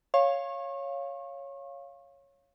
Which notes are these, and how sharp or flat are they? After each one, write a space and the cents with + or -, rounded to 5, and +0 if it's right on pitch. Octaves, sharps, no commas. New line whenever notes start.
C#5 +0 F5 +0 C#6 -35